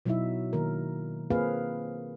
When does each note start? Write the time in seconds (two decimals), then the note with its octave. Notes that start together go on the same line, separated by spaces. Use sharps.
0.05 B2 F#3 D#4 E4 F#4 E5
0.53 D#3 A#3 A#4
1.30 A#3 C4 F4 G#4 B4 F5